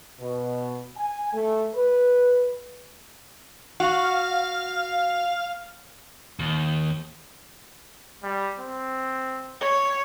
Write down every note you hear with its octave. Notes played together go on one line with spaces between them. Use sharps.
B2
G#5
A3
B4
F#4 F5
D#2
G3
C4
C#5